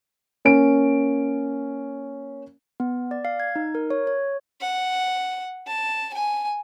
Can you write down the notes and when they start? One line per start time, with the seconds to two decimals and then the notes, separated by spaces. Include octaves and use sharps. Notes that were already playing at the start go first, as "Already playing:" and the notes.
0.45 A#3 C#4 D7
2.80 B3
3.11 D5
3.25 F5
3.40 G#6
3.56 D#4
3.75 A#4
3.90 C#5
4.07 C#5
4.61 F#5
5.67 A5
6.14 G#5